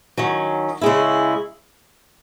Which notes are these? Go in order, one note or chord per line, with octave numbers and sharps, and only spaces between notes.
D#3 F#3 C#4
C#3 G#3 C#4 E4